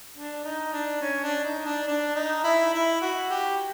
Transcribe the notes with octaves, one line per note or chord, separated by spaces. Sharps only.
D4
D#4
D4
C#4
D4
D#4
D4
D4
D#4
E4
E4
F#4
G4